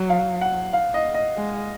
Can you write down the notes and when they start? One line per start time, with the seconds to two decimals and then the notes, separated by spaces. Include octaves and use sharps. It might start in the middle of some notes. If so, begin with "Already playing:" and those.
Already playing: F#3
0.10 F5
0.41 F#5
0.73 F5
0.94 D#5
1.14 D#5
1.36 G#3